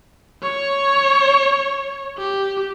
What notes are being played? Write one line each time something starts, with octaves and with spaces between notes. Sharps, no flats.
C#5
G4